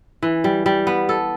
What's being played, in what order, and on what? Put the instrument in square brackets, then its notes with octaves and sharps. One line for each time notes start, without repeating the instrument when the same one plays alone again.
[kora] E3
G3
G3
B3
A4